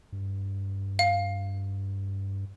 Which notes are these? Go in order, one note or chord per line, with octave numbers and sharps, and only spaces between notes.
G2
F5